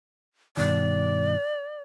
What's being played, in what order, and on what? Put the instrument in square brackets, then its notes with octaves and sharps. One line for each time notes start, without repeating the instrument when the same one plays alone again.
[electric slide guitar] G2 B2 D#3 [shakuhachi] D5